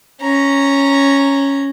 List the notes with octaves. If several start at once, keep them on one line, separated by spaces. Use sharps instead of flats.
C#4 A#5